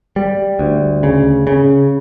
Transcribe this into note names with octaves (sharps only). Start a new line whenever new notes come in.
G3
D2
C#3
C#3